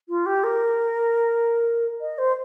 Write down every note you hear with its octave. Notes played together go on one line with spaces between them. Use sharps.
F4
G4
A#4
D#5
C5